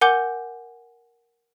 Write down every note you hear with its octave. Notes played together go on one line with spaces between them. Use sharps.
A#4 F#5 G#5 D6 G6 G7